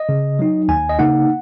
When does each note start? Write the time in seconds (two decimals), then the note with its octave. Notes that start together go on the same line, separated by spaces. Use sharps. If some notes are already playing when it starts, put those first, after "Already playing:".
Already playing: D#5
0.09 C#3
0.39 F#3 D#4
0.68 D#2 G#5
0.89 D#5
0.99 C#3 A#3 D#4 F#5